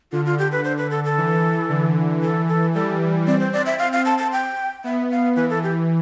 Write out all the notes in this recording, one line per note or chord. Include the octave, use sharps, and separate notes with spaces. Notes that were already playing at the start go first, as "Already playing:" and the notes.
D3 F4
F4
G4
B4
D3 C5
B4
A4
A4
E3
D3
E3 A4
A4
G3 A4
C4 D5
C5
D5
E5
F5
F5
A5
A5
G5
B3 E5
F5
E3 B4
A4
G4